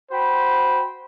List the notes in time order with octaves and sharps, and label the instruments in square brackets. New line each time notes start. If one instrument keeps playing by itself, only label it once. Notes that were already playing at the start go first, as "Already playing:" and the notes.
[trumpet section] F#4 C5 G5 B5